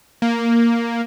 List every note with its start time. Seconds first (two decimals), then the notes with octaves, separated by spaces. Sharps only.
0.22 A#3